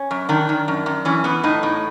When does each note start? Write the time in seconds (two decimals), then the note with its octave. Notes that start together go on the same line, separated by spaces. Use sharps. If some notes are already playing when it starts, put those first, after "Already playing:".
Already playing: C#4
0.11 F#2
0.29 D#3 D4
0.49 D#3
0.68 F#2
0.86 F#2
1.05 E3 C#4
1.24 E3 B3
1.44 A2 D#4
1.63 A2